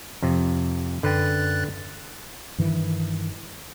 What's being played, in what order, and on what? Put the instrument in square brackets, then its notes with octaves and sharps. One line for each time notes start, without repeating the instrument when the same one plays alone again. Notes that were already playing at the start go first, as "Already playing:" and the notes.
[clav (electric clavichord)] F2 C3
[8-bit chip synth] F#2 F#6 A6 [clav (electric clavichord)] D3 B4 G5
[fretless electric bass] G2 D#3 E3